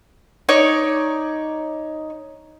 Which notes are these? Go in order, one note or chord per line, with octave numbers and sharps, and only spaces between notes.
D#4 C#5 D5